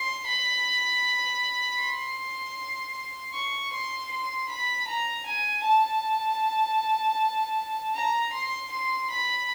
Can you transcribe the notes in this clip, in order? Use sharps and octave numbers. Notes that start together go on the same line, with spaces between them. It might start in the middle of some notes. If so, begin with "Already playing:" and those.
Already playing: C6
B5
C6
C#6
C6
C6
B5
A#5
G#5
A5
A#5
C6
C6
B5